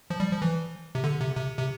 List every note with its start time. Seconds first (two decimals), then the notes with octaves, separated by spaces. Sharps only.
0.10 F3
0.20 G3
0.31 F3
0.42 E3
0.95 C3
1.04 D3
1.21 C3
1.36 C3
1.59 C3